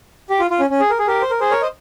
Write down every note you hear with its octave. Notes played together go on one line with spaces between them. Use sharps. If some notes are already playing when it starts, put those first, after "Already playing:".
G4
F4
F4
C#4
C#4
G#4
A#4
G#4
G4 A#4
C5
A#4
G#4 C5
A#4 C#5
C5 D#5